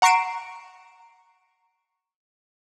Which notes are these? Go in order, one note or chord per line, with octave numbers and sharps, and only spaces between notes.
F#5 A#5 C#6 C7 D7 E7